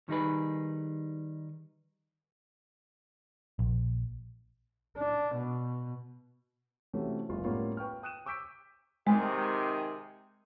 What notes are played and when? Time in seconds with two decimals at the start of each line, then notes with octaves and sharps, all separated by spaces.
0.09 D#3 G3 D#4 G#4 B4
3.59 A#1
4.96 D4
5.35 B2
6.94 C3 E3 A3 C#4 F#4
7.29 F#1 C#2 G#3 A#3 F4
7.45 A2 G3 A#3 B3 C#4 F4
7.77 B4 G5 C#6 F6
8.02 G5 D#6 F#6 D#7 E7
8.26 C#6 D6 E6 G6 B6 D7
9.07 C3 D#3 G#3 G#4